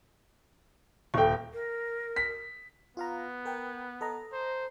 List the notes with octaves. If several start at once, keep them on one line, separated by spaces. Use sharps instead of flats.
D#1 A4 G5 C#6
A#4
B6
B3 F4 F5 A#5
A#4 G5
A4 D#5 A#5
C5